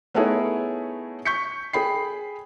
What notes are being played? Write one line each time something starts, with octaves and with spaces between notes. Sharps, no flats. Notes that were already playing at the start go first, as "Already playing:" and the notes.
A3 B3 D#4 E4 G#4 C#5
C#6 G6 B6 C#7
G#4 G5 B5 C7